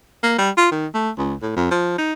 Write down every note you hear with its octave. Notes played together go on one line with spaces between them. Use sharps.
A#3
G3
F4
D#3
A3
C#2
A2
F2
F3
D#4